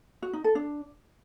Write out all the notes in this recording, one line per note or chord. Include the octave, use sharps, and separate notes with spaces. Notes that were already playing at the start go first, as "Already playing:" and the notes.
F#4
D#4
A4
D4